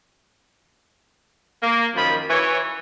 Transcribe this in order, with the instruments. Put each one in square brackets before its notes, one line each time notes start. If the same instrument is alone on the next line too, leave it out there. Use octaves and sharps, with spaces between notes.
[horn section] A#3
F#2 D#3 F3 F4 B5
E3 C#5